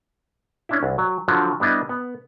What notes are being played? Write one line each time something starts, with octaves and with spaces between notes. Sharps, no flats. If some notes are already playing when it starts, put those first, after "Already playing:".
C#4 D4 E4
C2
F#3
D3 F3 F#3
G3 B3 D4 E4 D#5
B3